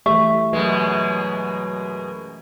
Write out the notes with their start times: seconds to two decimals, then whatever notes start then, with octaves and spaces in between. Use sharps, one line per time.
0.06 E3 A3 G4 E5 C#6
0.53 F#2 B2 G#3 B4